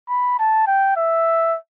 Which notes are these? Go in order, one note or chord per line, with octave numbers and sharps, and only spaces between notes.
B5
A5
G5
E5